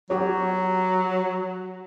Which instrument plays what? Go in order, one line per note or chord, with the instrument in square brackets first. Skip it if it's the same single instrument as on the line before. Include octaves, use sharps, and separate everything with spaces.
[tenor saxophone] F#3 [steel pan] F#4 G4 C#5